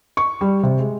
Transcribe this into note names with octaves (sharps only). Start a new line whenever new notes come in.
C#6
G3
C3
G#3